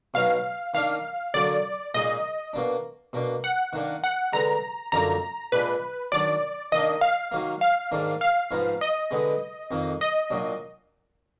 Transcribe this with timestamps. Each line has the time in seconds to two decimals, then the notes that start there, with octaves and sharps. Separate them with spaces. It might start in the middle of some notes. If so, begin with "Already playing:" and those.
0.14 B2 F#3 B3 D#4 F5
0.74 D#3 A#3 D4 F5
1.34 D3 F#3 A#3 D5
1.94 A#2 G#3 D#4 D#5
2.53 B2 A#3 D4
3.13 B2 A#3 D4
3.44 F#5
3.73 D#3 A#3 D4
4.04 F#5
4.33 D3 G#3 B3 A#5
4.92 F#2 D3 F3 A#3 D#4 A#5
5.52 A#2 G#3 D4 B4
6.12 D#3 F#3 D4 D5
6.72 D#3 A#3 D4 D#5
7.01 F5
7.32 D#3 F#3 A#3
7.61 F5
7.92 G#2 D#3 A#3 D4
8.21 F5
8.51 G#2 F3 G#3 B3 D#4
8.81 D#5
9.11 D3 G#3 B3
9.71 F2 D#3 A#3
10.01 D#5
10.30 A#2 F#3 D4